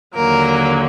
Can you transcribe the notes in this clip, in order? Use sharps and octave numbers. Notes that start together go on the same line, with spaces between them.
D#2 D3 F#3 A#3 A#4